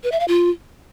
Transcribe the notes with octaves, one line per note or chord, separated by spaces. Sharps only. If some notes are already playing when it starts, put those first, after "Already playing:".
B4
E5
F5
F4